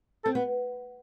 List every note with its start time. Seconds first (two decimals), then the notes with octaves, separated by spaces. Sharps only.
0.25 C4 A4
0.35 B3